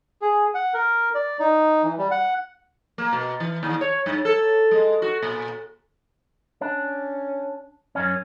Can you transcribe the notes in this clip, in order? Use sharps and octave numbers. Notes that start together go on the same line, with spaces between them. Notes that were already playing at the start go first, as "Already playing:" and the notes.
G#4
F#5
A#4
D5
D#4
E3
G3
F#5
A#3
B2
E3
D#2
C#5
G2
A4
G#3
F#4
A#2
C#4 D4
F#2 C#4